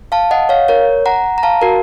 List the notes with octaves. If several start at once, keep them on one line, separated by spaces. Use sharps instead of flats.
F5 A5
D#5 F#5
C#5 F5
A#4 C#5
F#5 A#5
A#5
F5 A5
F#4 A#4